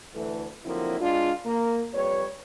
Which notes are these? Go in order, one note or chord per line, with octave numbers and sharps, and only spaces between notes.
D2 E3 A3
D3 F3 F#3 A#3 C4 E4
G#3 D4 F4
A#3
F2 G3 B4 C#5